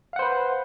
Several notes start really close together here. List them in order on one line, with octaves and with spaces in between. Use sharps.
F5 F#5 C5 B4